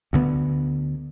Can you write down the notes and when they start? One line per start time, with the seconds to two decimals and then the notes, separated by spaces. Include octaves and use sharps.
0.13 D2 D3 B3